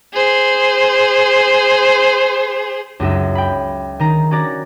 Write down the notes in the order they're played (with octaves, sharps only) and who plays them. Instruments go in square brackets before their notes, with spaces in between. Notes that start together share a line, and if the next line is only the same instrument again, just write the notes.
[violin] G#4 C5
[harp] C#2 F#2 D#4 E5
G5 B5
D#3 D#4 A#5
C#4 F#4 D5 A#5